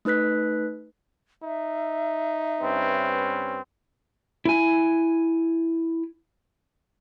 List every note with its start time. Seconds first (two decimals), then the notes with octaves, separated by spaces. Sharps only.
0.05 A3 D#4 B4 F#6 B6
1.43 D#4 E5
2.61 G2 C4 C#4 B4
4.45 E4 G#5